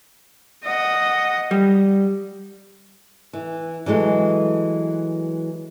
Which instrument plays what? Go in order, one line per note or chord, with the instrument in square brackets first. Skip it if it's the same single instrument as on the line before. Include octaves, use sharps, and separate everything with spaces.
[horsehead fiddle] D#5 F#5
[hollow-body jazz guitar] G3
[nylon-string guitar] E3
E3 F#3 G#3 A3